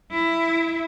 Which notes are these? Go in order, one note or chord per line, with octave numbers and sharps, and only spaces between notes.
E4